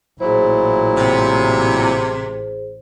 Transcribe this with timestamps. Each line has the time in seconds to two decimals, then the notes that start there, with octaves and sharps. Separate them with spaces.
0.20 A1 A#2 F#3 E4 G#4 C5
0.96 C3